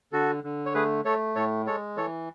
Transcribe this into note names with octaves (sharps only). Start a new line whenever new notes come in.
D3 F#4 A4
D3
C#5
A3 G#4 B4
A3 A4 C#5
A2 A4 C#5
G#3 A4 C#5
E3 A4 C#5